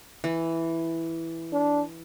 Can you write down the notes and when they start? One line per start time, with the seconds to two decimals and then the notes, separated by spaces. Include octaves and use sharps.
0.24 E3
1.53 D4